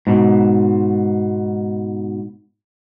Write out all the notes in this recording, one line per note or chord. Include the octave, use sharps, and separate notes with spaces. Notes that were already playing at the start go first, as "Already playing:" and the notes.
G#2 B2